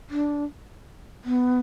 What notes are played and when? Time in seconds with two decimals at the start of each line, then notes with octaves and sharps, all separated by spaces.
0.10 D4
1.24 B3